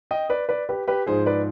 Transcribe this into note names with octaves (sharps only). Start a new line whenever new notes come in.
D#5 G5
B4 D5
B4 D5
G4 B4
G4 B4
G#2 F3 G#4 C5
B4 D5